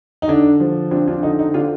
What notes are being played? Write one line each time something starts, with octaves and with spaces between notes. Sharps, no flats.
D#4
D3 D4
F3
C4 D4 F4
D4 F4
D3 D#4
D#4
D3 D4 F4